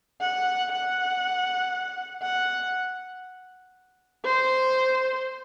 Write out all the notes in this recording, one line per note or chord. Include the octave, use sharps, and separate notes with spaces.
F#5
F#5
F#5
C5